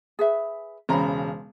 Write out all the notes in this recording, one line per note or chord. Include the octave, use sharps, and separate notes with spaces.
G#4 B4 E5
E1 C#3 C5 A#5 B5